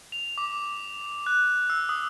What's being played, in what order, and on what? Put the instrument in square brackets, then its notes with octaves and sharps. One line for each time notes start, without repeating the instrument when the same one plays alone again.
[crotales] F7
D6
F#6
E6
D#6